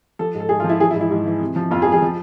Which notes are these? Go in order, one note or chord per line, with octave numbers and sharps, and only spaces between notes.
F3 A4
G#2
A4
G#2 G#4
F4
F3
E4
E3 G#4
E4
G#2
E4
G#2
E3
C3
F3
F2 F4
G#4
F2
G#4
F3